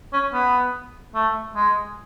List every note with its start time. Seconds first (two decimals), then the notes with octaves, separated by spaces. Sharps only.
0.13 C#4
0.33 B3
1.15 A3
1.56 G#3